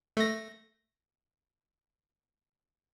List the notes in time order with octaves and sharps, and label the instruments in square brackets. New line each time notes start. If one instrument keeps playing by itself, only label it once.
[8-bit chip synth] A3 A#6